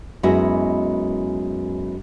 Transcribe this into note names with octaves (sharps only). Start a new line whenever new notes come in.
F#2 G#3 B3 E4 F#4 D#5